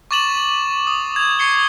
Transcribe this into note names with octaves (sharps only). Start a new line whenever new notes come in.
C#6 D6 A6 E7 F#7
D#6
G#6 F7
C#6 C7 C#7 G7